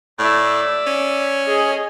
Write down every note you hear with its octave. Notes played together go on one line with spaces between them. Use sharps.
A2 D5 E5
C#4
G#4 D#5